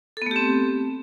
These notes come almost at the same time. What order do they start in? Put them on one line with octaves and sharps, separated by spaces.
A4 B3 A3 G4 C4